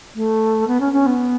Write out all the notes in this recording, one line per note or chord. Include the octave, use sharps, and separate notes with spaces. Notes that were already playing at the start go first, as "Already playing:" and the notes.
A3
B3
C#4
C#4
B3